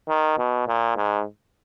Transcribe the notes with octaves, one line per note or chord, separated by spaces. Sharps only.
D#3
B2
A#2
G#2